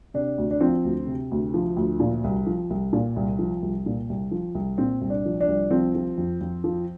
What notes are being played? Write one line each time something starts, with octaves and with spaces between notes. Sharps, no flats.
C3 D4
D2
D4
F3 C4
D2
C3
D2
F3
D2
A#2
C2
F3
C2
A#2
C2
F3
C2
A#2
C2
F3
C2
A#2 C4
C2
D4
F3
D4
C2
F3 C4
F3
F2
F2
F3